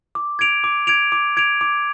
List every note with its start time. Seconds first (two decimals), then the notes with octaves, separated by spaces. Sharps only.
0.15 D6
0.39 G#6 D7 F7
0.64 D6
0.87 G#6 D7 F7
1.12 D6
1.37 G#6 D7 F7
1.61 D6